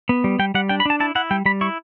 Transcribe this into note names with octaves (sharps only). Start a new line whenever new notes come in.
B3
G3
G3 G5
G3 F#5
D4 G5
B5
D4 A5
E4 A5
E4 F#5
G3 G5
G3 B5
E4 C#6